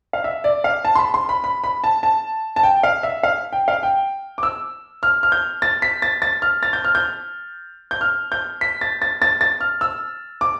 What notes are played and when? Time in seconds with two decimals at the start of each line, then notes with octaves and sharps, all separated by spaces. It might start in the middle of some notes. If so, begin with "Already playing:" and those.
0.13 F5
0.24 E5
0.44 D5
0.64 F5
0.85 A5
0.95 C6
0.99 B5
1.14 C6
1.29 B5
1.44 B5
1.64 B5
1.84 A5
2.03 A5
2.56 A5
2.63 G5
2.83 F5
3.03 E5
3.23 F5
3.52 G5
3.68 F5
3.83 G5
4.38 D6
4.43 E6
5.03 F6
5.23 F6
5.32 G6
5.62 A6
5.82 B6
6.02 A6
6.22 A6
6.42 F6
6.63 A6
6.73 G6
6.84 F6
6.95 G6
7.91 G6
8.01 F6
8.32 G6
8.61 B6
8.81 A6
9.02 A6
9.22 A6
9.41 A6
9.61 F6
9.81 E6
10.41 D6